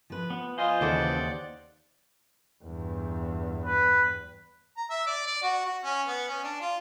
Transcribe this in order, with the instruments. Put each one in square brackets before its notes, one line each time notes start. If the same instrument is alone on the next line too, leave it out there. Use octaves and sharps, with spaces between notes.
[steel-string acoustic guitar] F3 B4
[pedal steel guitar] B3
[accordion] F4 F5 G#5 [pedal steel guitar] C5 D#5
[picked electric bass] D#2 [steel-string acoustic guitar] C#3 E3 A4 [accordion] D5 F#5 D6
[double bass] E2 G2
[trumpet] B4
[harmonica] A#5
E5
D5
D5
F#4
F#4
C#4
B3
C#4
D4
F4